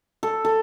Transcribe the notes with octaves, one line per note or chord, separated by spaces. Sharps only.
A4
A4